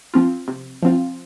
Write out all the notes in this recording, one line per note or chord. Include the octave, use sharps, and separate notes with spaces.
F3 C4 F4
C3
F3 C4 F4